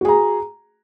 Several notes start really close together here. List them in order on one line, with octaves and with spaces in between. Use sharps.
F#4 G#4 A#5